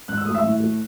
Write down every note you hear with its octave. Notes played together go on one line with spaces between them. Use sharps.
G#2 F#6
E6
A3 D#6
E5 E6
A2
A3